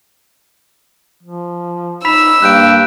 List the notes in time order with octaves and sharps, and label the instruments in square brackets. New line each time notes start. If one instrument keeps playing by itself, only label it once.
[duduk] F3
[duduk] D#4 [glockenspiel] B5 B6 E7 [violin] E6
[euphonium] G2 [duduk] A#3 [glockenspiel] F#6 G6 D7